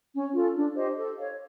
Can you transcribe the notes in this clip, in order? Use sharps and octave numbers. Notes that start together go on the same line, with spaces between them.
C#4
F4 A4
D4
G4 C5 D#5
A4
C#5 F5